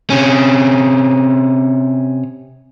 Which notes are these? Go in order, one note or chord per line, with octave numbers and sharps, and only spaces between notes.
C3 C#4